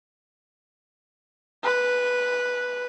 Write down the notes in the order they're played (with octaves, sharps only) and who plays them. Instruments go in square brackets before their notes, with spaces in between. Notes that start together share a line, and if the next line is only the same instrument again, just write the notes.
[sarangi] B4